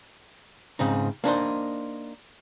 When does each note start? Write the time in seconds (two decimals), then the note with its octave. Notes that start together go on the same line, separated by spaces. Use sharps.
0.79 G#2 C#3 C4 D#4
1.24 A#3 D4 D#4 C5